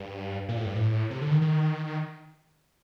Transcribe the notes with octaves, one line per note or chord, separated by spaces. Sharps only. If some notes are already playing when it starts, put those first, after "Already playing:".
Already playing: G2
A#2
A2
G2
A2
C3
D3
D#3
D#3